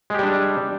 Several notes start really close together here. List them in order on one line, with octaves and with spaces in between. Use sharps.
G#3 G4 G3 D4